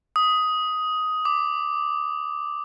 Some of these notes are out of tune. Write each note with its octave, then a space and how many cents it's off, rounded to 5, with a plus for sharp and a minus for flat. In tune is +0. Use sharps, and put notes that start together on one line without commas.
D#6 +10
D6 +5